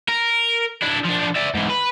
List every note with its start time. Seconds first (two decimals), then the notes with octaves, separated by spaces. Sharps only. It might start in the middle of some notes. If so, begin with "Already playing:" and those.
0.09 A#4
0.83 D4 E4
1.05 F3 D4
1.36 D5 E5
1.55 G#2 E3
1.70 B4